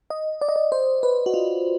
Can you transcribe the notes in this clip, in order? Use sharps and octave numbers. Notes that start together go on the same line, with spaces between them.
D#5
D5
D#5
D5
C5
B4
F#4
F4